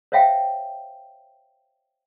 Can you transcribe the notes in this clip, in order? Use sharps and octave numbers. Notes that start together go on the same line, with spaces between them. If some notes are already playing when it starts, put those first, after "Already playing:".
C5 C#5 E5 F5 G5